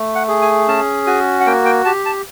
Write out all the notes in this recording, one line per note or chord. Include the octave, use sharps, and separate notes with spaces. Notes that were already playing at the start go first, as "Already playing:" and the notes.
Already playing: A3
F#5
G#4
G#5
C#4 A5
F#4 G#5
F#5
A#3 G5
G5
G4 A5
A5